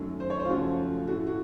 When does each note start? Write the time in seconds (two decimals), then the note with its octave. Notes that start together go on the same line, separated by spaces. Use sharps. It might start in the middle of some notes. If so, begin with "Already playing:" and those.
Already playing: F#2 D#3 F#3 A3
0.20 C5
0.30 C#5
0.40 C5
0.45 F4
0.49 F#2 C#3 F3 A3 F#4
1.07 A2 A3 F#4
1.27 F#4